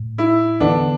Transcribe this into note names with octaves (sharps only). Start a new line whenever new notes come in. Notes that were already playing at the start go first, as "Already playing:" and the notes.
Already playing: A2
E4
E2 D3 B3 D4